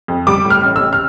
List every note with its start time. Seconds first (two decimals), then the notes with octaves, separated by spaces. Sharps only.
0.08 F2
0.27 G3 D6
0.45 A2
0.50 F6
0.63 A1
0.76 E6
0.81 A1
0.93 F6